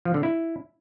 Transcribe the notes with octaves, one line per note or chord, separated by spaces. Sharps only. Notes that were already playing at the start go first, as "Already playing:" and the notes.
F3
D3
E4